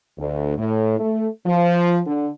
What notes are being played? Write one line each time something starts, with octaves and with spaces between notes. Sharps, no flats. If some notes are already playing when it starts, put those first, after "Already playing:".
D2
A2
A3
F3
D3